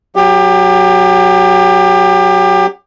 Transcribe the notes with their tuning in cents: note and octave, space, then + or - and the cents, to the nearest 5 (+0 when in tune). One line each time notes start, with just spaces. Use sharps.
F#3 +0 G4 +25